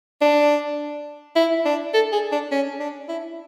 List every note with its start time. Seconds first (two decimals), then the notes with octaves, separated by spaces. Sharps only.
0.21 D4
1.36 E4
1.65 D4
1.94 A4
2.12 G#4
2.32 D4
2.52 C#4
2.80 D4
3.09 E4